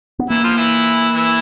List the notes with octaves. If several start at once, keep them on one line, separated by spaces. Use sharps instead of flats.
B3
E3 A#3 E4
F3 F4
E3 E4
E3 E4